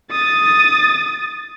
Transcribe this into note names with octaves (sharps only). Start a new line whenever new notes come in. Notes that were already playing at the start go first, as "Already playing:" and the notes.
D#6 A6